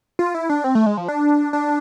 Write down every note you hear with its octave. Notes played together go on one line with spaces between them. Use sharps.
F4
E4
D4
C4
A3
G#3
F3
D4
D4